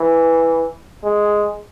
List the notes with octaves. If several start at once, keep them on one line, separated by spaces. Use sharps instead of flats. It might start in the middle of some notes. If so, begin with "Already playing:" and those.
Already playing: E3
G#3